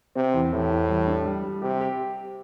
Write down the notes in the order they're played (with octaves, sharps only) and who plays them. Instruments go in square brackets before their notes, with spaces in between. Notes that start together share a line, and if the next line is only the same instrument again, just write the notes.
[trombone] C3 [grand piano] C4
[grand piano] E2
[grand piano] E2 [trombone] A2
[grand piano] E2
G3
D4
G3
G3
[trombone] C3 [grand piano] G4
[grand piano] G4